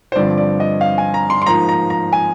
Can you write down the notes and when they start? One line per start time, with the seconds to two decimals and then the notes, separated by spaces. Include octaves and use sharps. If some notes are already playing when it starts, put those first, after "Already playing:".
0.12 C5
0.15 G2 D3 F3 C4 D5
0.37 D5
0.60 D#5
0.81 F5
0.98 G#5
1.14 A#5
1.30 C6
1.42 C6
1.46 G#2 F3 A#3 A#5
1.69 A#5
1.90 A#5
2.13 G#5